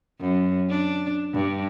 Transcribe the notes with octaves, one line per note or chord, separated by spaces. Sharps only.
F#2
D4
G2